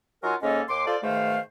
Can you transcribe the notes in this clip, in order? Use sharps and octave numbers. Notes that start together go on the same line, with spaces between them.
F#3 D#4 F4 A#4 F#5 G#5
G#2 C#3 A#3 C#4 A4 D#5
D#2 C6 D6
F4 A4 C5 D5
G#2 B2 D#3 A3 C5 F5